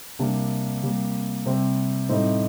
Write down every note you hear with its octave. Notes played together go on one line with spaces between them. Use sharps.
C3 G3 A#3 D4
C3 G3 A#3
C3 G3 C4
A2 G3 C4 D#4